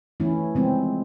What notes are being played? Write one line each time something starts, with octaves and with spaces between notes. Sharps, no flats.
E3 A3 C#4 E4
C#3 F3 G#3 C4